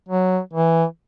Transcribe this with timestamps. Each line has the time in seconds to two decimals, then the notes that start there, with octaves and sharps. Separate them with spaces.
0.09 F#3
0.53 E3